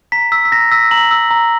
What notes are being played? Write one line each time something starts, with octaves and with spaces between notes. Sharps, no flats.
A#5 B6
E6 B6
B6
A#5 A#6
E6 B6
A#5 F#7
E6
A#5